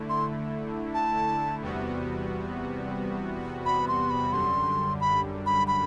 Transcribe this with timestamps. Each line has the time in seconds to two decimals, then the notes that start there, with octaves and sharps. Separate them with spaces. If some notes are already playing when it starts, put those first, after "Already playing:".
Already playing: D3 A3 E4
0.09 C6
0.94 A5
1.62 E2 C3 G3 B3 F#4
3.66 B5
3.88 C6
4.10 B5
4.32 F#2 D3 G3 C6
5.00 B5
5.46 B5
5.68 B5